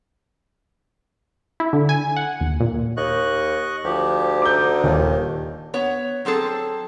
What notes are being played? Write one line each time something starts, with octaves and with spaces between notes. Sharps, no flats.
E4
D3
G#5
F#5
D#2
A#2
D#2 D#5 C#6 F#6
D2 F3 G4
D3 D#4 D6 G6
D#1 D#2
B3 C#5
F#3 C4 G#4 A4